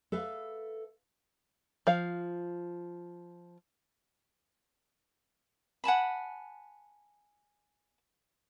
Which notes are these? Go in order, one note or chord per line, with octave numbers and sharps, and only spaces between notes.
A4 B4 E5 F5
F3 F5
F#5 G#5 A5 B5